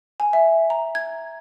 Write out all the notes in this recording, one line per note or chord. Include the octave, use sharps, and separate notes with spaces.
G#5
E5
A#5
G#6